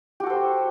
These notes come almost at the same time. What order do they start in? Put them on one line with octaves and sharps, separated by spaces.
G4 F#4 A4 C5